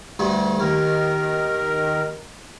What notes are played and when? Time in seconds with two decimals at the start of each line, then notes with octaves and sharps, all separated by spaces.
0.19 D2 G2
0.60 D#2 D#3 A#4